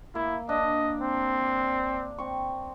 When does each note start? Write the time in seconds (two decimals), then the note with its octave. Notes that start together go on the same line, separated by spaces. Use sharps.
0.15 A#3 E4
0.49 D4 D#5
1.01 C4
2.18 C4 C#6